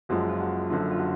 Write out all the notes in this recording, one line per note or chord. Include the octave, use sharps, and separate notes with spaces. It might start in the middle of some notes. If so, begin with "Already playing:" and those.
F#1 F#2 F3 G#3 F#4
F4
F#4
F#1 F#2 D3 F3
F4
F#4